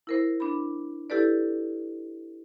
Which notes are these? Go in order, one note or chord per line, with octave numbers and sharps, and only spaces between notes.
E4 A#4 C5
D4 B5
E4 G4 A4 B4 D5